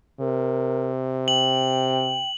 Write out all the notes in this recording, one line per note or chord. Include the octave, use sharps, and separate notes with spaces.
C3 A#4
G5 F#7